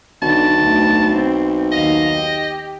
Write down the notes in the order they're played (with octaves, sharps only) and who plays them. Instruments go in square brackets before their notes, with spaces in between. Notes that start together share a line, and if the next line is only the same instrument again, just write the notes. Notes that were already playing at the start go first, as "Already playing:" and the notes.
[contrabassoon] B1 [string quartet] D3 [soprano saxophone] A5
[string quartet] D2
C4
[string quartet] D#2 F5 [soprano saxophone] D#5
[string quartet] G4